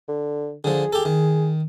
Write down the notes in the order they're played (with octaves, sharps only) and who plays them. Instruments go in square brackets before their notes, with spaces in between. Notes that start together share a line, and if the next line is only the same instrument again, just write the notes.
[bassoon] D3
[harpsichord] D3 F3 [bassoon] G#4
[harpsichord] G4 A4
D#3